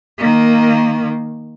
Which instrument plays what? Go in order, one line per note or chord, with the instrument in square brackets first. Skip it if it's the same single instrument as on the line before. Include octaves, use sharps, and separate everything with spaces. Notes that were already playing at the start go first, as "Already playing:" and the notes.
[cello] D#3 A#3